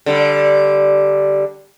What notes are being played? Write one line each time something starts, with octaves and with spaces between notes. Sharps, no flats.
D3 G3